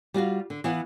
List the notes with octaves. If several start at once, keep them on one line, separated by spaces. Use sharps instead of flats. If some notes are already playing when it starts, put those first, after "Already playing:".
G3 F4 F#4 F5
D3
E3 B3 F5 F#5